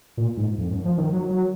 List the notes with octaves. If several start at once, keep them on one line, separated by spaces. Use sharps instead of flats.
A#2
G#2
F2
F#2
F3
D#3
F#3
F#3